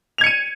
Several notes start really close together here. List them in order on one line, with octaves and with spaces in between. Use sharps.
F7 G#6 C#7 D#7